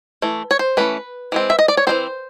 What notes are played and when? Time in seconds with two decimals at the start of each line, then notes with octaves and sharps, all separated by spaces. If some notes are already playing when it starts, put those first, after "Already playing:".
0.22 E3 A3
0.51 C#5
0.59 C5
0.77 E3 A3 C#4 B4
1.32 E3 G#3 C4
1.50 E5
1.59 D#5
1.68 D5
1.77 C#5
1.87 E3 G#3 C4 C5